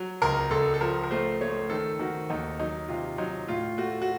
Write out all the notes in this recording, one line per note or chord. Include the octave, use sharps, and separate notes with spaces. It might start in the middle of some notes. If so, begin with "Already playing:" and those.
Already playing: F#3
C#2 A#4
C#2 A4
A4
F3 A#4
A#4
A3 C5
A3 C#5
D#3 A4
D#3 F#4
D#2 D#4
F#3 D#4
C3 F4
F#3 D#4
A2 F4
A3 F#4
F#4